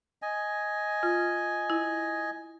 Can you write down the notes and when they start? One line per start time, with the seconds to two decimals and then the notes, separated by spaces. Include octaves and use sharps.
0.22 D#5 G#5
1.03 F4
1.70 E4